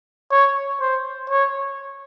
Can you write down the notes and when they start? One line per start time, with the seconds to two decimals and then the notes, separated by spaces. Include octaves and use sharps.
0.31 C#5
0.81 C5
1.30 C#5